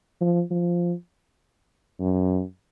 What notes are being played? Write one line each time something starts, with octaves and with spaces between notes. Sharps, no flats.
F3
F3
F#2